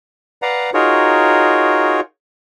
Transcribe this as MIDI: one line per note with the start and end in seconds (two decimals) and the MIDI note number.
0.42 0.70 71
0.42 0.70 74
0.42 0.70 77
0.42 0.70 78
0.42 0.70 82
0.74 2.00 63
0.74 2.00 65
0.74 2.00 66
0.74 2.00 68
0.74 2.00 70
0.74 2.00 73